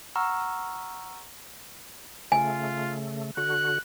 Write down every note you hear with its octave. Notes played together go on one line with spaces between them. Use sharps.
F#5 A#5 C#6 E6 F6
C#3 A3 F4 G#5
D3 F#4 F#6